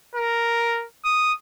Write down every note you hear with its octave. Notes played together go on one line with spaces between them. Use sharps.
A#4
D#6